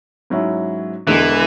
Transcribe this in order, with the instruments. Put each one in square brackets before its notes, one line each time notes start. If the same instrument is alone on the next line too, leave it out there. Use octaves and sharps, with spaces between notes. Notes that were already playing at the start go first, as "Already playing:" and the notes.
[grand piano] G#2 F#3 C#4 E4
[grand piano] E1 E2 D3 G#3 B3 [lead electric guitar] E3